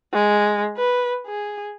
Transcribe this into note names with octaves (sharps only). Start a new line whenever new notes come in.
G#3
B4
G#4